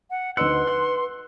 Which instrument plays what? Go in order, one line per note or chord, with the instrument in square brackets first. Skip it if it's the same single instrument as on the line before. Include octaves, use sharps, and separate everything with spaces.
[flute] F#5
[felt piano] D2 D#4 E6 [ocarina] B4 [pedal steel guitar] F#5 [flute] C6
[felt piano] F#6